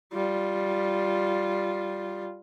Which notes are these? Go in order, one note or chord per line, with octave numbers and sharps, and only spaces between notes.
G3 F4